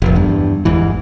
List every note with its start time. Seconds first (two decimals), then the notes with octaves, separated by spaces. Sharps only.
0.02 F1 A#1
0.15 E2 G2
0.65 G1 E2 G#2 E3